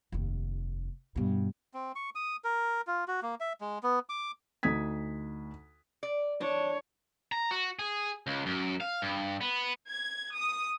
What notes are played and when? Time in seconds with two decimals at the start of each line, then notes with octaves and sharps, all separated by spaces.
0.12 F1 D#2
1.16 G2 B2
1.74 C4
1.96 C#6
2.15 D#6
2.44 A#4
2.87 F4
3.08 F#4
3.23 A#3
3.40 E5
3.61 G#3
3.83 B3
4.09 D6
4.63 D2 D#4 D#6 G#6 B6
6.03 D5
6.41 D4 C#5
7.32 A#5
7.51 F#4
7.79 G#4
8.27 C#2
8.46 F#2
8.81 F5
9.02 G2
9.41 B3
9.88 G#6
10.35 D#6